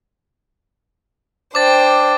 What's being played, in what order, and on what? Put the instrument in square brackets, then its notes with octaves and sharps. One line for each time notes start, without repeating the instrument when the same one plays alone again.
[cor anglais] D4 [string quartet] C5 G5 [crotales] D6 A6